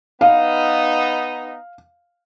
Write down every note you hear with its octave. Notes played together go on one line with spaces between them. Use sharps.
B3 D#4 F5